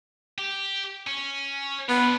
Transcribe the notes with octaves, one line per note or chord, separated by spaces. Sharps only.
G4
C#4
B3 D4 F4